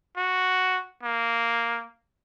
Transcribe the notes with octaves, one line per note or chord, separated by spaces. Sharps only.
F#4
A#3